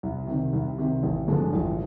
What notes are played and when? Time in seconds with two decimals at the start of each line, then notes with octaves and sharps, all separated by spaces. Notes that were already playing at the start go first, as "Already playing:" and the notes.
0.03 C2
0.27 C3 D#3
0.53 C2
0.78 C3 D#3
1.03 A1
1.28 G2 D3 F3 G#3
1.53 A1